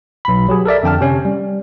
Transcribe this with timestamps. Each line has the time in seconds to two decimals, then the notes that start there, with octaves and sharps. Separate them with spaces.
0.25 B1 B5
0.49 F#3 G4 G#4
0.66 A4 A#4 D5 E5
0.83 F2 D3 G5 A5 F6
1.01 C3 C#4
1.25 G3